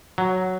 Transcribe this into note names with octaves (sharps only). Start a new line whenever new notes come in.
F#3